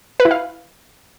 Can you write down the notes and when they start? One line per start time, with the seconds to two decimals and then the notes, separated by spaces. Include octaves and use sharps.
0.20 B4
0.25 E4
0.31 F5